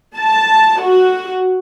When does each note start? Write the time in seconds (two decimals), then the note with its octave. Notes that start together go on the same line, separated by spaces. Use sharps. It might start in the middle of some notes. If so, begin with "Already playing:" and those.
0.18 A5
0.81 F#4